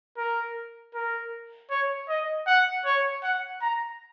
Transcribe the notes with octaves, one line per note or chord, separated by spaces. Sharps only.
A#4
A#4
C#5
D#5
F#5
C#5
F#5
A#5